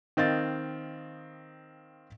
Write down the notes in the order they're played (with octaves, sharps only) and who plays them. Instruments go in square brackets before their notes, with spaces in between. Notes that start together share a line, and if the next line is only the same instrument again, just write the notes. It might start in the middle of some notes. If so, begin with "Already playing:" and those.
[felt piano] D#3 C4 D#5 F5 A6